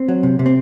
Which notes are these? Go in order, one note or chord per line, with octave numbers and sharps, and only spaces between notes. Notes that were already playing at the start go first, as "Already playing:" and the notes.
Already playing: C4
F#3
C3
C3
C4